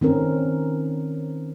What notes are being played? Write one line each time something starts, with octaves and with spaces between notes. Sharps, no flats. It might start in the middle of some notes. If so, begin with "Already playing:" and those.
D#3 C4 C#4 A#4